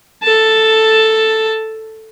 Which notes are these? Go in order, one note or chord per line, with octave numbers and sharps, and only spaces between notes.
A4 A5